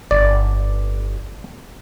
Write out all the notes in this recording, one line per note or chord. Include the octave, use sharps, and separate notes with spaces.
G1 D5